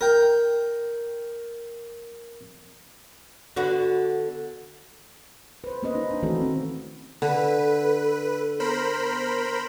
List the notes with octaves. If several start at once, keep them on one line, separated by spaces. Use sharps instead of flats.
A#4 G5
D3 B3 F#4
B4 C5
A#3 B3 C#4 B4 C5 D#5
C#4 D#4 B4
D4
D#3 E3 A3 C4 F#4 A4
C4 C#4
D3 A4 B4
B3 A#4 C5 B5